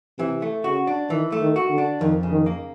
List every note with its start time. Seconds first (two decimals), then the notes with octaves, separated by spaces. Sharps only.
0.19 C3 E3
0.42 A3
0.64 C#3 F#4
0.87 D4
1.10 D#3 E3
1.32 A3
1.41 D#3
1.56 F#4
1.70 D3
1.78 D4
2.01 F2 D#3
2.23 C#3
2.31 D#3
2.46 A#3